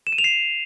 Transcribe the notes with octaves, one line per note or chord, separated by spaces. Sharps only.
E7
D#7
F7
C7